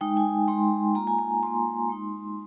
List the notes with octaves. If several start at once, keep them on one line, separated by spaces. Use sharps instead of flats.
G#3 D#4 G5
G#5
G#3 D#4 C6
A#3 F4 A#5
G#5
G#5
A#3 F4 C6
G#3 D#4